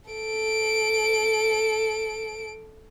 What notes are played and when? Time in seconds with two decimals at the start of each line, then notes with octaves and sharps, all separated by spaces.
0.11 A4 D7